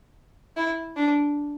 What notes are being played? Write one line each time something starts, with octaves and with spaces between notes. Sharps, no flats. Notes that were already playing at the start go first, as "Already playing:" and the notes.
E4
D4